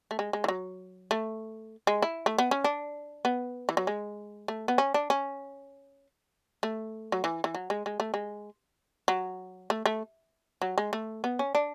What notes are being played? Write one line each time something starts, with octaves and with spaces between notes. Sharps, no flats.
A3
G#3
G#3
E3
F#3
A3
G#3
E4
A3
B3
C#4
D4
B3
E3
F#3
G#3
A3
B3
C#4
D4
C#4
A3
F#3
E3
E3
F#3
G#3
G#3
A3
G#3
F#3
A3
A3
F#3
G#3
A3
B3
C#4
D4